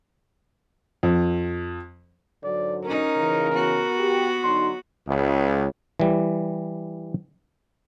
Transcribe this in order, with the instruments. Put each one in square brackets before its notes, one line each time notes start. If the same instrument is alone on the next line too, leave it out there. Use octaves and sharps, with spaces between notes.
[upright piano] F2
[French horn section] G#2 D3 F#3 [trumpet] D5
[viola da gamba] C#4 D#4 [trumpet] A#4
[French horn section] C#3 E3
[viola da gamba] B3 F#4
[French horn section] G4
[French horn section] D3 F#3 D#4 [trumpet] C6
[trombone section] C#2
[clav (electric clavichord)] E3 G3